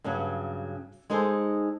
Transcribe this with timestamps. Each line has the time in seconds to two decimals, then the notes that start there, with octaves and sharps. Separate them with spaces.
0.04 G2 C#3 F#3 C#4
1.10 G#3 D#4 G#4 A4 C5